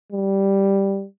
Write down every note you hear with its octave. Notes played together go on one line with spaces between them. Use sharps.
G3